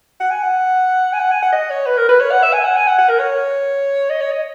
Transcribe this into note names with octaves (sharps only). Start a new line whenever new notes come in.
F#5
G#5
F#5
G#5
F#5
G#5
F#5
D#5
C#5
B4
A#4
B4
C#5
F#5
E5
G#5
F#5
G#5
F#5
F#5
A#4
C#5
D#5
C#5
D#5